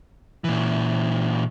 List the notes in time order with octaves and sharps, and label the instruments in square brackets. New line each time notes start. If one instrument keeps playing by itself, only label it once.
[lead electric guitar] A#2 E3